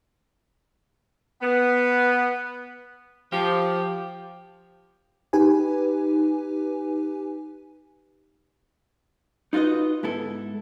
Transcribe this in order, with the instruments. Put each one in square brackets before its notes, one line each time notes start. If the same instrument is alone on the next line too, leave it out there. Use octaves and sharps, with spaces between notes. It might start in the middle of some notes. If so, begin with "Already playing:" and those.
[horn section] B3
[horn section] F3 [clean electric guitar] G4
[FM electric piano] D#4 G4 B4 G#5
[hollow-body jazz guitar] D#4 F4 F#4 B4 D#5
G#2 B3 E4 A4